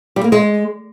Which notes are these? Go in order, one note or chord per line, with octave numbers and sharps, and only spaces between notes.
G3
A#3
G#3